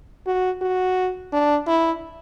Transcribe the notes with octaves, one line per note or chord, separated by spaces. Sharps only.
F#4
F#4
D4
E4